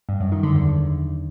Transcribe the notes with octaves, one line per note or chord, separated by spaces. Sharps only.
G2
F#2
D#3
D3
E2